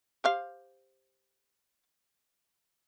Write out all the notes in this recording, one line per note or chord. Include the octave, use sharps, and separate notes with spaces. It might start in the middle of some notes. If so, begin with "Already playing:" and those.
G4 C5 F5